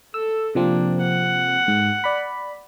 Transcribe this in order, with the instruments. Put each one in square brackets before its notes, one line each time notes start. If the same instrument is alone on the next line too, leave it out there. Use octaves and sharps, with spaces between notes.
[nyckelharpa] A4 [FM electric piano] E6
[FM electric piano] C3 F3 C4 [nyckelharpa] A#3 D4
[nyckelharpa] F#5
[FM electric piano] G#2
D5 B5